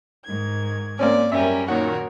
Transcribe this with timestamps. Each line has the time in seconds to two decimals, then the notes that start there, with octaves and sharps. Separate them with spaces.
0.25 G#2 D#3 G#6
0.99 A#3 C4 C#4 D5
1.32 F#2 G3 C#4 A#4 E5
1.68 A#2 D#3 F#4 A#4 C#5 F#5